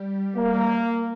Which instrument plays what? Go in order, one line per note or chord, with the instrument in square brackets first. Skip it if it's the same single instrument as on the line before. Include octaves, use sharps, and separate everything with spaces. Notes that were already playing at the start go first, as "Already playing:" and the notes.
Already playing: [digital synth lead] G3
[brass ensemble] A#3